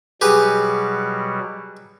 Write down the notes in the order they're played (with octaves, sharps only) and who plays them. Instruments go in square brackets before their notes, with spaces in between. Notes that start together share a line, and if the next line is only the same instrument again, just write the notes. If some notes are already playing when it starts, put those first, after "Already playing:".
[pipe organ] B2 F#3 G3 [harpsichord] G4 G#4 B4